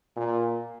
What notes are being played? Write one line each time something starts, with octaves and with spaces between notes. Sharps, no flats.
A#2